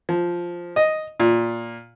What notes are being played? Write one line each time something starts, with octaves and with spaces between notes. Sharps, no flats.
F3
D#5
A#2